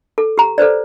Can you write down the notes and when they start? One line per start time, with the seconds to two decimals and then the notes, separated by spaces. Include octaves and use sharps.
0.18 A4
0.38 G4 A#5
0.58 A4 B4 C5 D5